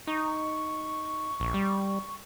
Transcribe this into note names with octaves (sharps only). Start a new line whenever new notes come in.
D#4 C#6
A#1
G3